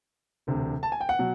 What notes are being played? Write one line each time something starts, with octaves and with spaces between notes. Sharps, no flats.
E1 D2 C3
A5
G#5
G5
F#5
B2 F#3